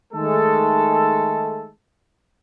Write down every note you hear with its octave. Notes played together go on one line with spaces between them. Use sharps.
D#3 G#3 A3 A4